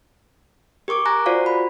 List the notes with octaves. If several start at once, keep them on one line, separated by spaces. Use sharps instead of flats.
G4 A#4 C#6 D6
G#5 A#5 C#6 F#6 A#6
F4 F#4 C5 D5 F5
B5